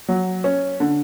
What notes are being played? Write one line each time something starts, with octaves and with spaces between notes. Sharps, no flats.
F#3
C#4
D3